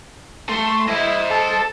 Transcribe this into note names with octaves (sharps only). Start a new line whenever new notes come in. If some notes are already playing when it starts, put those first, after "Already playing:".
A3 C6
E4 C5 D#5
A4